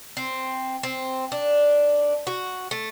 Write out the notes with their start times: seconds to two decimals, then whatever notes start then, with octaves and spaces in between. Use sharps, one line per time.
0.17 C4
0.83 C4
1.32 D4
2.27 F#4
2.71 A3